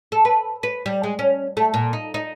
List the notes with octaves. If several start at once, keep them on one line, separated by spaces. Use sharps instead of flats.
A4
B4
B4
G3
G#3
C#4
A3
A#2
D#4
D#4